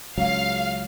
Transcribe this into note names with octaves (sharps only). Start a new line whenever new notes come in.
C#2 F#3 F5